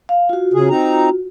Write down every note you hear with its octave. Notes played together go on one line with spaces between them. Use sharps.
F5
F4 F#4
C#3 G#4
C4 D#4 A#5